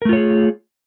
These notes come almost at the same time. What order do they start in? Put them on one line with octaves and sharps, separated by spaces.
A#4 A3 F4 C#5 G#4